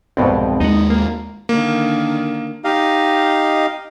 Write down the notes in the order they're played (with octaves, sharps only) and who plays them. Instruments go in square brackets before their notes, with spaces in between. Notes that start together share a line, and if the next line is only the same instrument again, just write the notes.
[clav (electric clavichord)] C2 F2 B2 [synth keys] G#2 B3 C4
[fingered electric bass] D#2 G#3 [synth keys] D#4 [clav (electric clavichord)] D#5 F#5
[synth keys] A#3
[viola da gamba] D3 D#3 [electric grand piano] A#3
[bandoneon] D#4 G4 D#5 F5